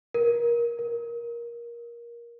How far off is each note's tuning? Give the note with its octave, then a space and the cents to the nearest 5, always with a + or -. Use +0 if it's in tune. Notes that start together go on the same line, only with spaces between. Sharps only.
A#4 +25
A#4 +20